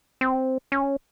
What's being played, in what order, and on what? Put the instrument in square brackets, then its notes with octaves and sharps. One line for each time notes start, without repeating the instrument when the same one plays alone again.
[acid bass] C4
C#4